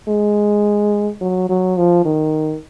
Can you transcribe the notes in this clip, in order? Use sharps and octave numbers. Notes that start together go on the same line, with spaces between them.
G#3
F#3
F#3
F3
D#3